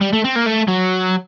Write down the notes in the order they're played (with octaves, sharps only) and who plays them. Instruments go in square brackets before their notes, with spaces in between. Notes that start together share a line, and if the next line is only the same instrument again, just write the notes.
[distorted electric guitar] G3
A3
C4
A#3
A3
F#3